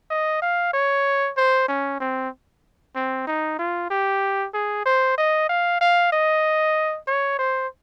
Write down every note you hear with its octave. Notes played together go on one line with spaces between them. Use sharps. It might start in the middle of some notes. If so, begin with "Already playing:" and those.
D#5
F5
C#5
C5
C#4
C4
C4
D#4
F4
G4
G#4
C5
D#5
F5
F5
D#5
C#5
C5